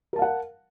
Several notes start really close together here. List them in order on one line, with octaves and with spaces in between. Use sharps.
A#4 A5 F5 F#5